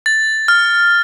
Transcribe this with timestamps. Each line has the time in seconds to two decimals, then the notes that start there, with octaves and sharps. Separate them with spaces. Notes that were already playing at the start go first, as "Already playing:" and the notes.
0.06 A6
0.48 F6